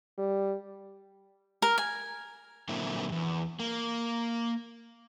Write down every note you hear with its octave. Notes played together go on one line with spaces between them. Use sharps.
G3
A#4
G#5
A#2 D3 F#3 A#3 C4 E4
E2 G2
A#3